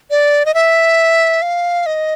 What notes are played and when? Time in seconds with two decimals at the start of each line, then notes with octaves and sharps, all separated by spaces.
0.11 D5
0.46 D#5
0.54 E5
1.42 F5
1.86 D#5